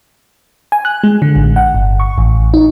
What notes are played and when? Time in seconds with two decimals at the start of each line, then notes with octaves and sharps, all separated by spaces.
0.72 G#5
0.85 F#6
1.04 G#3
1.22 D3
1.36 A1
1.56 F#5
1.75 G1
2.00 C#6
2.18 A1
2.54 D#4